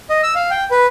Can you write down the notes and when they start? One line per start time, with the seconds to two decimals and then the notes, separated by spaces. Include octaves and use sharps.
0.10 D#5
0.23 E6
0.35 F5
0.50 G5
0.71 B4